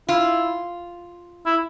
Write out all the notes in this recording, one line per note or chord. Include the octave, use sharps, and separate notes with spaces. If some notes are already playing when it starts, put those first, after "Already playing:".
E4 F4
E4